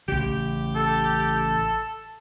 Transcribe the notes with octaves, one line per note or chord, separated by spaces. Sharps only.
A1 C#3 G4
A4